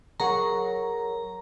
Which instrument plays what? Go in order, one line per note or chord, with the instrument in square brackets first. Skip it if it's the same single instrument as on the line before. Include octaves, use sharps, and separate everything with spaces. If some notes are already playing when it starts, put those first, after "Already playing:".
[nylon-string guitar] F#3 G#4 F#5 [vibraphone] A#4 [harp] C#5 C#6 [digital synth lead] A#5